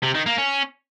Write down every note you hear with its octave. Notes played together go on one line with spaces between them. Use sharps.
C3
D#3
A#3
C#4